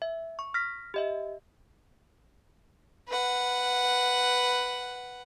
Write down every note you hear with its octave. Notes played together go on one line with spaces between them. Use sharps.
E5
C#6
F6 A#6 B6
G4 D#5 E5
B4 F#5